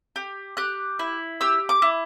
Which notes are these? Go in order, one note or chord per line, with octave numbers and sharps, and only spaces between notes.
G4
G4 F#6
E4
G4 E6
D6
E4